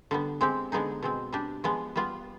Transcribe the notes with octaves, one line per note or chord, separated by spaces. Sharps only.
D3 G3 B3
G#3 C4 G4
D3 G#3 B3 D#4 G#4
B2 G#3 C4
G3 D4 G4
F3 G#3 B3
G3 B3 F4